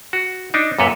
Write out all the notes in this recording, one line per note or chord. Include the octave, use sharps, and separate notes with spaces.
F#4
D4 D#4
F#2 A#2 A4 B4 C#5